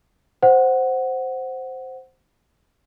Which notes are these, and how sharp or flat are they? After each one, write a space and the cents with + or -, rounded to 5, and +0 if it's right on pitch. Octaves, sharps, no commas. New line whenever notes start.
C5 +0 F#5 +0